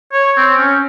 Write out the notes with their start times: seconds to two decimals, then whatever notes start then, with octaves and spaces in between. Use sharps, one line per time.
0.13 C#5
0.37 C4
0.57 C#4